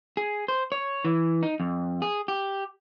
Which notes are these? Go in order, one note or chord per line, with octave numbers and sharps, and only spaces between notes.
G#4
C5
C#5
E3
D#4
F2
G#4
G4